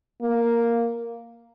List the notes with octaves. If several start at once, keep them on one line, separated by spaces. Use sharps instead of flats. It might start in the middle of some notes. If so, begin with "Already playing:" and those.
A#3